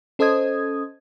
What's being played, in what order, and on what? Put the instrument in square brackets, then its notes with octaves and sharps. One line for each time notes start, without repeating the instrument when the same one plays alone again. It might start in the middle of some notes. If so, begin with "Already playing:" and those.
[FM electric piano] C#4 A4 C5 D#5 D#6 G#6